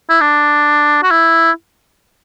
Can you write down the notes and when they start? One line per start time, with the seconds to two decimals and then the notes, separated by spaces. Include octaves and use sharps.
0.09 E4
0.21 D4
1.03 F#4
1.11 E4